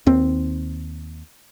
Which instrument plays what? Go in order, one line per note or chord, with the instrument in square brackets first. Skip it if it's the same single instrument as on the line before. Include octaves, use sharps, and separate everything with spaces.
[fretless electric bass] D#2 C4